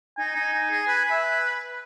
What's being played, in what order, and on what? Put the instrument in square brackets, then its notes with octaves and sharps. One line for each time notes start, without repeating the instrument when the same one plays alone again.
[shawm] D#4 [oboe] G#5
[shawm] D#4
D#4
G#4
B4
B4
[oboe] E5